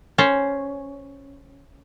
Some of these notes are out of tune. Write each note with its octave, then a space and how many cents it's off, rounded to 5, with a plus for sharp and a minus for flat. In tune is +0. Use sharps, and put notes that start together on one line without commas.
C#4 +0 C5 +0